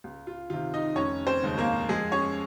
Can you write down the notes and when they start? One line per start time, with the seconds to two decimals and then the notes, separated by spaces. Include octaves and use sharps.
0.04 C#2
0.27 F4
0.50 C3 D#3 F4
0.74 D#4 D#5
0.96 F1 C#4 C#5
1.27 C4 C5
1.43 D#2 C#3 G#3 C4
1.58 A#3 A#4
1.89 F2 G#3 G#4
2.12 C#4 C#5